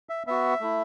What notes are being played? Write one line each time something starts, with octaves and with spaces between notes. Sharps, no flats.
E5
B3 F#4 E5
A3 E4